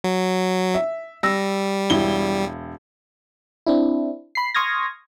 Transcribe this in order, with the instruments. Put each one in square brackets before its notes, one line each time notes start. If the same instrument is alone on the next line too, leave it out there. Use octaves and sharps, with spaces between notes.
[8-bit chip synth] F#3
[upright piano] E5
[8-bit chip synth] G3 [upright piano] E6 A#6
[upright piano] E1 E4 G7
[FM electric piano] C4 D4 E4
B5 C7
C6 C#6 D#6 F6 G#6 A#6